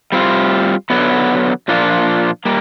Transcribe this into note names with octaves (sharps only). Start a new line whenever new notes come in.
G3 C4 F4
D3 F#3 B3
A#2 F3 A#3 D4 F4
G3 A#3